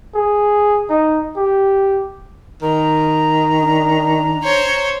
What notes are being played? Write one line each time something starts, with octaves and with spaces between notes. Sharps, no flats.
G#4
D#4
G4
D#3 A#5
D4
C5 C#5